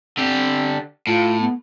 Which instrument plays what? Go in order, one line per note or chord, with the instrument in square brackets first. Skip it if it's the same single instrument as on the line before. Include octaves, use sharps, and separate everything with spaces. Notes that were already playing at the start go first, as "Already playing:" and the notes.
[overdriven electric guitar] D3 G4 [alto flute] C4
[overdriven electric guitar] A2 [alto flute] F4
[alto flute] B3